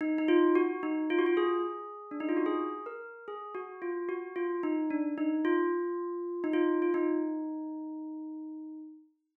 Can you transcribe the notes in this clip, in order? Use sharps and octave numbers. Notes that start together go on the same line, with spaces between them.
D#4
D#4
F4
F#4
D#4
F4
F#4
F4
G#4
D4
D#4
F4
F#4
G#4
A#4
G#4
F#4
F4
F#4
F4
D#4
D4
D#4
F4
D#4
F4
F4
D#4